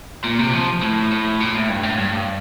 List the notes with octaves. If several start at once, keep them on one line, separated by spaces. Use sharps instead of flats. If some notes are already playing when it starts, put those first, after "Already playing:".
A#2
C3
F3
A2
A2
A#2
A2
G2
A2
G2